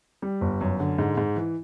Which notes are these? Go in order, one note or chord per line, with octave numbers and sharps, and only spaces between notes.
G3
G1
F#2
D3
G#2
G#2
E3